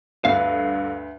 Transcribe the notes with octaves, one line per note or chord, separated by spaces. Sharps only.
D2 G2 D3 B4 F5